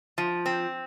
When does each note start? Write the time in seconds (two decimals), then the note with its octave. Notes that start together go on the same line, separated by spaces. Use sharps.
0.18 F3
0.46 C4